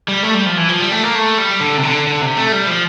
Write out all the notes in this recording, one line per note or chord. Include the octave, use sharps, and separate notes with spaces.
G3
A3
G3
F3
E3
F3
G3
A3
A#3
A3
G3
D3
C3
D3
D3
C3
A3
G3
F3